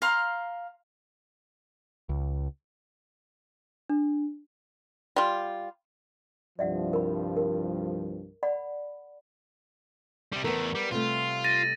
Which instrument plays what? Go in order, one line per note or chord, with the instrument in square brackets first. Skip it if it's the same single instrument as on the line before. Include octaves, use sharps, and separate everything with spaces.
[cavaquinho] F5 A#5 C6
[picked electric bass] C#2
[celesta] D4
[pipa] G3 F4
[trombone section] C2 G2 F3 [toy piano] D5 E5 F#5
[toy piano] A#4 B5
A#4
D5 F#5 B5
[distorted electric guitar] C3 G3
[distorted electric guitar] E2 A3 [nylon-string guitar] B3 A#4
[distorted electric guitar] G3
[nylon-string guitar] C3 G3 A3 [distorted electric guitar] F4
[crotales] A6 A#6 D#7